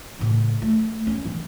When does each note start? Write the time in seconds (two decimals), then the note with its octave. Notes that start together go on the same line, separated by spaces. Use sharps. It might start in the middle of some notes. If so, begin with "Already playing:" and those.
0.19 A2 C#3
0.62 A3
1.07 C#4
1.25 E3